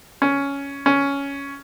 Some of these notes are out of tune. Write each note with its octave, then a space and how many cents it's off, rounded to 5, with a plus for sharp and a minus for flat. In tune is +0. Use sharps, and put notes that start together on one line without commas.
C#4 +10
C#4 +10